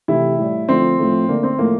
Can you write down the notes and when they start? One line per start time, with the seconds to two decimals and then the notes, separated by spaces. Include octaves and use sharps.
0.08 C3 E3 A3 E4
0.39 A2 G3
0.69 D3 F3 A3 C4
0.98 A2 F3 A3
1.29 D3 A3 A#3
1.43 C4
1.59 A2 F3 A3 A#3